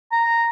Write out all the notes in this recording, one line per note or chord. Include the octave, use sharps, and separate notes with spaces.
A#5